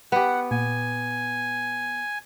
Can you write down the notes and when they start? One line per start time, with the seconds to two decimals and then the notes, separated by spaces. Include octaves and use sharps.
0.12 B3 G4 F#5
0.51 A#2 G#5